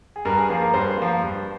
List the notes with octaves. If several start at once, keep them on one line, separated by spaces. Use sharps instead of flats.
G#4
G2 A#4
G#4
F3 A#3 G#4
A#4
G2 C5
F3 A#3
G2